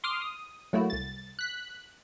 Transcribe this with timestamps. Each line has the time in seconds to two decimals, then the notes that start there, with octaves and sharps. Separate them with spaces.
0.04 C6 D6 D#6 F6
0.22 D#6
0.73 F#3 A3 A#3 E4 F#4
0.90 C2 A6
1.39 F#6 B6